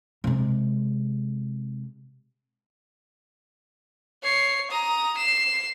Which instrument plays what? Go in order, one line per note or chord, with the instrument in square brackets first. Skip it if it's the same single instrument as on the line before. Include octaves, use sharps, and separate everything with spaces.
[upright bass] C3 G#3
[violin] C#5 C7
A#5 D#6
C7 E7